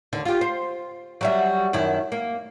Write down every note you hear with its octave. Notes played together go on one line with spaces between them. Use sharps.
D#2 D3
F4 G4
C5
F#3 G3 E5
F#2 D#3 E4
A#3